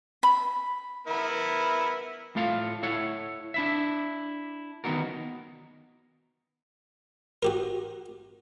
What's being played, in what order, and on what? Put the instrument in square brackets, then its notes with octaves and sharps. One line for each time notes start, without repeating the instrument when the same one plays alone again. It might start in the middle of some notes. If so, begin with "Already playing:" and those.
[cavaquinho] B5
[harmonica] B3 E4 A#4
[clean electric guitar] A2 A3 F4 A4 F5
E4 A4 C#5 F#5
D4 E4 E5
D#3 B3 C#4 D#4 F#4 A#4
[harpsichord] F#4 G4 A#4